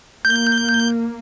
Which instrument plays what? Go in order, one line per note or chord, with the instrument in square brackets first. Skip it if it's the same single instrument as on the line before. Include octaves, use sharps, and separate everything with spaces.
[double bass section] A#3 [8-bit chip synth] G6